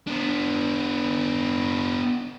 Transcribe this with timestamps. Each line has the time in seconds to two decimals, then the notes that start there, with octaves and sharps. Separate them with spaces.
0.07 B3 D4